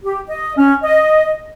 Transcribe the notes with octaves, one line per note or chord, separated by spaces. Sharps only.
G4
D#5
C#4
D#5